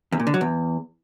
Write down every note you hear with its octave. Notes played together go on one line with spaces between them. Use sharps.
E2
A#2
D3
F#3
E2